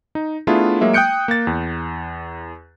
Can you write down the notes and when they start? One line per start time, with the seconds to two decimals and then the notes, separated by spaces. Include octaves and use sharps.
0.15 D#4
0.47 A3 B3 D4 E4 F4 G#4
0.81 F#3 G#3 A#3 E5
0.93 G5 D#6 F#6 G6 C#7 D7
1.28 A#3 A6
1.47 E2